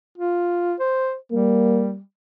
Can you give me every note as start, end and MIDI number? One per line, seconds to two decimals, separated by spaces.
0.18 0.74 65
0.80 1.15 72
1.32 2.00 55
1.32 1.93 58